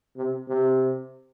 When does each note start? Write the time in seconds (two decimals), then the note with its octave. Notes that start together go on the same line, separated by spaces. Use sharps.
0.17 C3
0.48 C3